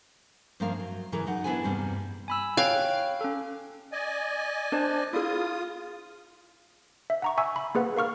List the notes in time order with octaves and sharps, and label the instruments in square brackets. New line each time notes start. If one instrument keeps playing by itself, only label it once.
[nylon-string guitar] G2 F3 A#3 C#4 A#4 F5
F#3
F#2 C#3 E3 G#4 A#4
F#2 D#4 F#5
B3 D4 E4 G#4 B4 G#5
E2 G2 C3 G3 A#3
[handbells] G#5 B5 E6
[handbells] C#5 G5 F#6 [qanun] F5
[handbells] C#4 A4
[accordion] D5 D#5 G#5
[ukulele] D4 C5 A5
[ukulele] E4 G#4 [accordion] F4 D#6
[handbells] E5
F#5 A#5 C#6
E5 G#5 C#6 E6
B5
A#3 G#4 B4 F#5
A#4 F5 C#6 F6